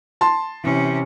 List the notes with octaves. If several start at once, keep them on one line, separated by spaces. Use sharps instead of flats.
A5 C6
C3 E3 C#4